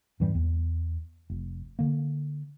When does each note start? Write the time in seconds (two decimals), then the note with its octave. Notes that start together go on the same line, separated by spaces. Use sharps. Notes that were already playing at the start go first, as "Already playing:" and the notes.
0.20 F2 G#2 E3 G3
0.35 E2
1.30 F1
1.79 D3 A#3